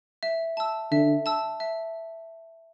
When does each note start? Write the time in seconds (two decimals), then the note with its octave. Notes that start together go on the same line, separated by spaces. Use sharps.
0.23 E5
0.57 A5 E6
0.91 D3 E5
1.26 A5 E6
1.60 E5